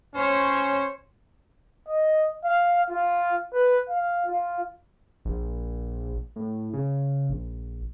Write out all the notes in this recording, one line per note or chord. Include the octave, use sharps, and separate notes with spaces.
C#4 C5 C#5
D#5
F5
F4
B4
F5
F4
A#1
A2
C#3
A#1